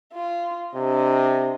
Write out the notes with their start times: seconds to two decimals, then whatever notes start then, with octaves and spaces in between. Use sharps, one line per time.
0.13 F4
0.74 C3 D4 D#5